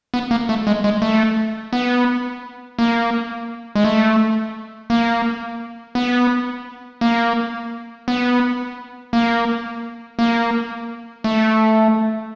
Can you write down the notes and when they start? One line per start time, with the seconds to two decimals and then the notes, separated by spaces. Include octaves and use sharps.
0.14 B3
0.31 A#3
0.49 A3
0.67 G#3
0.84 G#3
1.02 A3
1.73 B3
2.79 A#3
3.75 G#3
3.84 A3
4.90 A#3
5.95 B3
7.01 A#3
8.08 B3
9.13 A#3
10.19 A#3
11.24 A3